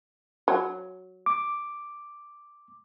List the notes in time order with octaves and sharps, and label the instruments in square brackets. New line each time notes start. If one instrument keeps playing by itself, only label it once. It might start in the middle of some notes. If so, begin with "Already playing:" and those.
[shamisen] F#3
[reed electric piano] D6